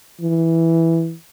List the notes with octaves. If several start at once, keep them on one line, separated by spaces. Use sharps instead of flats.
E3